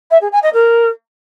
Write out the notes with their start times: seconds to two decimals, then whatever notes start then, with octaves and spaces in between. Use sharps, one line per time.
0.11 E5
0.21 G#4
0.32 G#5
0.43 D#5
0.53 A#4